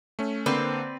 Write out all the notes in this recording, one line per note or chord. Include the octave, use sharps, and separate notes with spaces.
A3 C#4
D3 A#3 C4 B4 D5